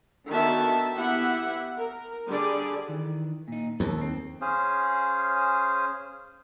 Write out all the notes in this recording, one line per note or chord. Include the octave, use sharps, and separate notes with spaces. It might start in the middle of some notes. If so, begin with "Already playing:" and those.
D3 D#3 B3 F#4 E5 A5
B3 E4 G4 E5 F#5
A#4
D3 G3 G#4 D5
D#3 E3
A#2 D#4
D#2 A4
C4
C#4 G#4 C5 F5